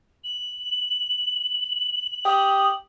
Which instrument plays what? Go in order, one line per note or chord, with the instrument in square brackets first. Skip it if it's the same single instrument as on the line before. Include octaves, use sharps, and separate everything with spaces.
[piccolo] F#7
[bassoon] G4 [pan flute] D#6